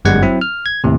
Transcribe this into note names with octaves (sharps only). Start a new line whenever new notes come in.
G1 F#2 G3 G#3 F#5 G#6
F#3 C4 E4
F6
G#6
D#2 A2 C3